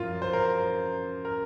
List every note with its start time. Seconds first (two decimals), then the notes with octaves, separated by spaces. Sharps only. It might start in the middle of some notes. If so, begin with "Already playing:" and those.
Already playing: F#2 F3 F4 A#4
0.22 C5
0.33 A#4
1.25 A#4